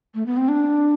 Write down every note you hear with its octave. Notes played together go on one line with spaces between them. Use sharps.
A3
B3
C4
D4